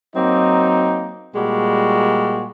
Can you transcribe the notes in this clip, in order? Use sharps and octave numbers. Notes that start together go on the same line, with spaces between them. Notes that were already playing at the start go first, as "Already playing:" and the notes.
F#3 A#3 C4 D#4
A#2 G3 G#3 F#4